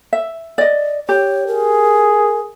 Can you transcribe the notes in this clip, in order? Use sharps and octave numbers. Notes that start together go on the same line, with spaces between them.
E5
D5 D#5
G4 C#5
G#4 A#4